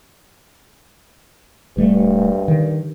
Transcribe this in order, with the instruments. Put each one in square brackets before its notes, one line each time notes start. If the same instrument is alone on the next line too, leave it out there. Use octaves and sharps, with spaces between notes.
[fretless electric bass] D1 G3 A3 [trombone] G2
[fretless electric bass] D#3